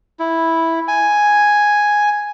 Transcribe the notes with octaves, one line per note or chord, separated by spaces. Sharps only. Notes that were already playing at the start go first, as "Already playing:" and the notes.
E4
G#5